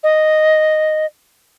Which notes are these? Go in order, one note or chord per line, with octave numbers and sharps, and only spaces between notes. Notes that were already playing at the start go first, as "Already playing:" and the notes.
D#5